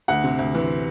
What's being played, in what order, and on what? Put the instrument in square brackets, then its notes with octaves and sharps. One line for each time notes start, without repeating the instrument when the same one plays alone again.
[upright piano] D2 F#5
C3
D2
E3